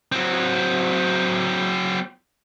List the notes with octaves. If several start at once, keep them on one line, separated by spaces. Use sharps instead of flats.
F#3 C4